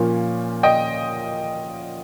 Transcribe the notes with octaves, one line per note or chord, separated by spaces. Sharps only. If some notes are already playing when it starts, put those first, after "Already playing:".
Already playing: A#2 F3 A#3 C#4
D#5 G5